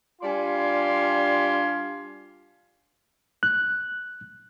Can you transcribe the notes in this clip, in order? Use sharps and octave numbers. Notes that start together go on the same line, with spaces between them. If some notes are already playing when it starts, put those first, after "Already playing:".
G3 D4 F4 D5 G#5 C6
F#6